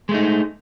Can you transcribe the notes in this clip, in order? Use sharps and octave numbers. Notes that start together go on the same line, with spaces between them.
G#3 A3 D#4